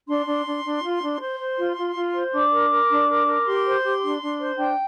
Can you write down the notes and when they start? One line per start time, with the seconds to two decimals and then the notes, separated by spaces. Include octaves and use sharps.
0.08 D4 C6
0.26 D4
0.46 D4
0.65 D4
0.83 F4
1.02 D4
1.21 C5 C6
1.39 C5
1.58 F4
1.77 F4
1.96 F4
2.14 C5
2.33 D4 D6
2.52 A#4
2.71 A#4
2.90 D4
3.08 A#4
3.28 A#4
3.46 G4 C6
3.65 C5
3.84 G4
4.03 D4
4.22 D4
4.40 C5
4.59 D4 G5